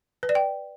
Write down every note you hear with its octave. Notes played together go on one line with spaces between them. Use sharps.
B4
D5
G5